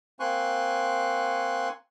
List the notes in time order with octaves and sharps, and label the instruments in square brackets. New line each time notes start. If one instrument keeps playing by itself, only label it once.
[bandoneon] A#3 C4 G#5 C6 C#6 F#6